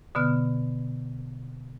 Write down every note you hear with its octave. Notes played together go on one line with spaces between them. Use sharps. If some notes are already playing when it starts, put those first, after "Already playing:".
B2 D3 B3 F6